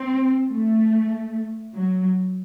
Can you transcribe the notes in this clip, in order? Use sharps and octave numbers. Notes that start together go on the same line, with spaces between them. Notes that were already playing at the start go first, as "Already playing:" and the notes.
Already playing: C4
A3
F#3